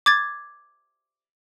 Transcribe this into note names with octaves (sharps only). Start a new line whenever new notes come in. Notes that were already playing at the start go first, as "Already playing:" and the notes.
D6 G#6 A6